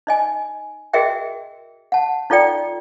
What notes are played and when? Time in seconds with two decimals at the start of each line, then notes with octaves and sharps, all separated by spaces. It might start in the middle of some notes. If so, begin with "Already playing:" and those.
0.07 D#4 D#5 G#5
0.93 F#4 G#4 A#4 D#5 E5 G5
1.92 F#5 A5
2.30 D#4 F4 A4 D5 G5